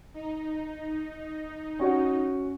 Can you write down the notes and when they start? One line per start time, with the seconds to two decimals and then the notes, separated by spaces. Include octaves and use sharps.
0.14 D#4
1.79 C#4 F#4